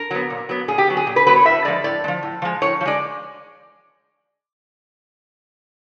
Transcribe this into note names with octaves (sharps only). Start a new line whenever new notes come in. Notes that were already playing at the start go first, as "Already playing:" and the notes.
Already playing: A#4
F#3 B3
A#2
F#3 B3
A#2 G#4
G4
F#3 B3
G#4
A#2
B4
F#3 B3 B4
C#5
A2 E5
F3 G#3 D5
A2 D5
G#3
F3
A2
F3 G#3
A2 C#5
F3
G#3 D5